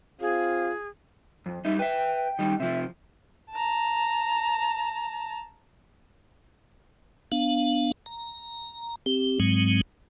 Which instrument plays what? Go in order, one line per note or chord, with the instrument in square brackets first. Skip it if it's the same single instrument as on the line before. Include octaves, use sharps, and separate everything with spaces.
[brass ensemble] C4 F4 F5 [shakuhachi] G#4
[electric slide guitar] F2
[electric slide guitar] G3 D#4 [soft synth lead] E5
[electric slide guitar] B4 E5 [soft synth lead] G5
[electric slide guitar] D#3 G3 D#4
[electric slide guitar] C3 F3 [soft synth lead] E5
[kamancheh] A5 A#5
[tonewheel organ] B3 D4 F5
A#5
C4 G4
G#2 F#3 G#3 C4